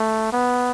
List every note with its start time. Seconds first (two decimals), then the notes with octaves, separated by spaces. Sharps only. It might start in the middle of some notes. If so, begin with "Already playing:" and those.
Already playing: A3
0.33 B3